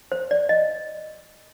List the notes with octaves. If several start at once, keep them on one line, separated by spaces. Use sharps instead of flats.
C5
D5
D#5